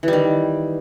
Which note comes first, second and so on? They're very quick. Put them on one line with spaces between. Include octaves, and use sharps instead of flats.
E3 G3 D#3